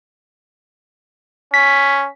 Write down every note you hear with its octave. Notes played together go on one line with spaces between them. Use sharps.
C#4 B6